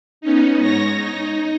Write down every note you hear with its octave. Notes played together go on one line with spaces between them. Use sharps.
B3 C#4 D#4
G#2 C#5 A#6
D#4